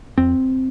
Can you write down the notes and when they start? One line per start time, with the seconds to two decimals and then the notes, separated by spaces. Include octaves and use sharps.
0.18 F2 C4